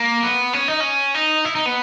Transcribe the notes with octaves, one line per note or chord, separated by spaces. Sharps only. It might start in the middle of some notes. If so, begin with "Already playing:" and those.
Already playing: A#3
B3
C#4
D#4
C#4
D#4
E4
D#4
B3